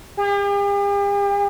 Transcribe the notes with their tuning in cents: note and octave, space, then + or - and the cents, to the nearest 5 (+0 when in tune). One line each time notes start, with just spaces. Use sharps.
G4 +45